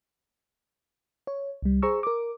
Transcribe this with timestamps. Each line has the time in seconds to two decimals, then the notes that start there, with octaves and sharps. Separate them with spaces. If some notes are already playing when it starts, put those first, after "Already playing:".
1.27 C#5
1.62 C2 G3
1.82 G#4 C5 A#5 C#6 E6
2.03 A#4 D6